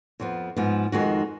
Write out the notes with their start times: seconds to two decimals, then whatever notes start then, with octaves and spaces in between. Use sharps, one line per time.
0.20 F2 F3 B3
0.56 G#2 F3 B3 F4
0.92 F2 D#3 G#3 D#4 F#4